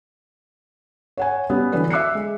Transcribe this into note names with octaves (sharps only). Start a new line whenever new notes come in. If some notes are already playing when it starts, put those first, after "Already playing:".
C#5 F#5 G#5
G3 B3 C#4 G4
D3 E3 F#3 D4 B4
E5 D6 F#6 C7 C#7
G#3